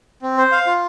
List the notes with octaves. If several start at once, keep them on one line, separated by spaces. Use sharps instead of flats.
C4
C5
F5
F4